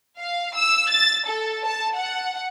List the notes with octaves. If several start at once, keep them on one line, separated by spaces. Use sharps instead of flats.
F5
E6
A6
A4
A5
F#5